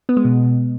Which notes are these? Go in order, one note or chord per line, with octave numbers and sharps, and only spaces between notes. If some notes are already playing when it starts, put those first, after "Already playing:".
B3
G#3
B2